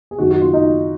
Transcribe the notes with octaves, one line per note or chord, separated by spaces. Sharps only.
G#4
F#2 D#3 F#4
F#4
F4
D#4